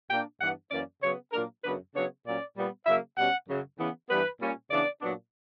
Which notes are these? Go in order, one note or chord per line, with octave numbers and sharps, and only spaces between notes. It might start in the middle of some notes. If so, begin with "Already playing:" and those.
A#2 A#3 D4 G5
G2 E3 B3 D4 F#5
F#2 E3 A#3 C#4 D5
C#3 F#3 B3 C#5
A#2 F#3 A#3 D4 A#4
F#2 C#3 F#3 B3 D4 B4
C#3 F#3 B3 D4 C#5
A#2 F#3 C#4 D5
A#2 G3 B3
C#3 F#3 A#3 E5
B2 G3 C#4 F#5
F#2 C#3 F#3
C#3 E3 B3
G2 E3 G3 B3 B4
A#2 G3 C#4
C#3 E3 B3 D4 D5
A#2 F#3 B3 D4